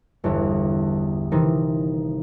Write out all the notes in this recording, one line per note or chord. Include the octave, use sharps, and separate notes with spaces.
G1 E2 D3
C3 D#3 E3 D#4